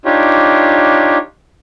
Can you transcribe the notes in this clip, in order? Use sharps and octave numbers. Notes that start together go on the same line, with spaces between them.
D4 D#4 F4 G4 C#5